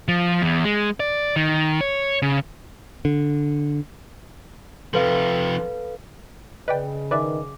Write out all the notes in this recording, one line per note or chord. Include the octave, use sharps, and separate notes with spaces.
F3
E2
G#3
D5
D#3
C#5
C#3
D3
C3 F3 A4 B4 F5
C#3 B4 D5 D#5 G5
D#3 B4 D5 E5 F5 G#5 D6